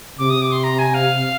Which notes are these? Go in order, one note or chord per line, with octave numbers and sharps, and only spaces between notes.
C3 D6
D#6
D6
C6
A#5
G#5
F5